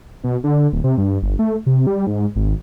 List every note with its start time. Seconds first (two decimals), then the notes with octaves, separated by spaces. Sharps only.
0.24 B2
0.44 D3
0.73 D1
0.84 C3
0.98 G2
1.22 G1
1.39 A3
1.66 C3
1.87 G3
2.07 G#2
2.36 G#1